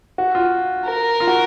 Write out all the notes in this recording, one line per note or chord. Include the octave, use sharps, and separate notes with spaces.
F#4
F4
A#4
F4
F#4